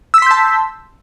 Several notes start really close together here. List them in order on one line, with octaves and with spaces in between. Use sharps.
E6 B6 C6 G6 A5